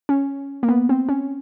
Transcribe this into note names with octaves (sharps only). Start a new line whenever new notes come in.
C#4
A#3
B3
C4
C#4